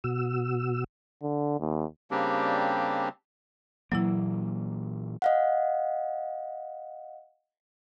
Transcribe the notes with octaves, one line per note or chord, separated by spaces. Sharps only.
B2 F#4 E6
D3
D#2
C#3 G3 A#3 C4 D4 G4
A#2 E3 F#3 A#3 E4
D#5 F5 F#5